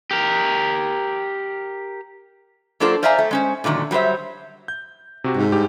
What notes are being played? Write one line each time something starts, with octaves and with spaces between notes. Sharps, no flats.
G4 A#4
F#3 A#3 D4 F4 A4 C5
C5 D5 E5 F5 G#5 A#5
A3
G#3 C#4 C5
A#2 D3 D#3 F#3 A3
F#3 G3 G4 C5 E5
G6
C3 F#4 G4
G#2
G2 G4